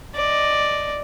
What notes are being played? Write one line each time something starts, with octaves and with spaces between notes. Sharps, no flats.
D5 D#5